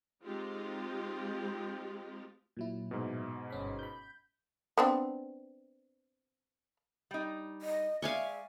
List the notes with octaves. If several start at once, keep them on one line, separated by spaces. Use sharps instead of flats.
G#3 C4 D#4 F4 G4
A#2 F#3 E4
G#2 B2
G1 C#4 B5
B5 G6
B3 C4 D4
G3 D#4
D#5
G#3 D5 E5 F5 G#5 C#6